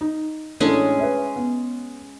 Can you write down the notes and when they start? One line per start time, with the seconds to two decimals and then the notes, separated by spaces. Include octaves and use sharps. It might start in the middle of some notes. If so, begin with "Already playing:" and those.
0.01 D#4
0.60 A1 G#3 C#4 D4 G#4 A4
0.99 B4 E5
1.36 B3